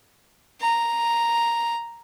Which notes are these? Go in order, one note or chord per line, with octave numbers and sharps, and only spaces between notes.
A#5